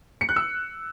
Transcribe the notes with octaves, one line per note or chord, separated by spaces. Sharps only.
C#7
F#6
E6